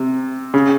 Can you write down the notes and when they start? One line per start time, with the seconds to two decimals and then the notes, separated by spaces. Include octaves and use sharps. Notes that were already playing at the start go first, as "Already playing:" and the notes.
Already playing: C3
0.54 C#3